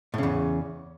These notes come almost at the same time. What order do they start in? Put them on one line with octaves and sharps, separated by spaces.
A2 C#3 E2